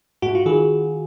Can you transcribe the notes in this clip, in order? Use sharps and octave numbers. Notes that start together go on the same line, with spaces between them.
G#2 F#4
F4
D#3 G#4